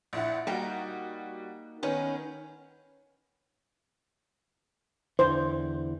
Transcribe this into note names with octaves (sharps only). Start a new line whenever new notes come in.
A#1 E4 F#5
G3 A#3 D#4 F#4 G5
D#3 B3 C#4 B4
E2 D3 E3 C5